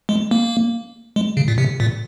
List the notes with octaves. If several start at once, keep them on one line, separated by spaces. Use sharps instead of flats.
G#3
A#3
G#3
C#3
A#2
C3
A#2